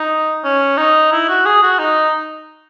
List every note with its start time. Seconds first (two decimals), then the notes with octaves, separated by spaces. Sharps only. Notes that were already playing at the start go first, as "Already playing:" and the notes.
Already playing: D#4
0.44 C#4
0.77 D#4
1.12 E4
1.28 F#4
1.46 G#4
1.63 F#4
1.79 D#4